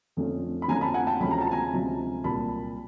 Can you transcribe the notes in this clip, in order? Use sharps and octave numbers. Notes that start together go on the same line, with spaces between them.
F2 D3 F3 A3 C#4
B5
F2 D3 F3 A3 C#4 G#5 A#5
A5 B5
F#5 G#5
G5 A5
D2 C3 F3 G#3 C#4 B5
A#5
A5
G#5 A#5
D2 C3 F3 G#3 C#4
C2 A#2 F#3 A5 B5